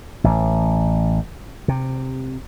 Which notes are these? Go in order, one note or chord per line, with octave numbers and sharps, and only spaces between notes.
A1
C3